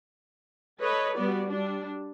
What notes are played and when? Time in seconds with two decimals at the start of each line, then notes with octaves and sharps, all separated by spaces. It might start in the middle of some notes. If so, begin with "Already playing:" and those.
0.81 A4 B4 C#5 D#5
1.15 G3 B3 F#4 D5
1.47 G3 D4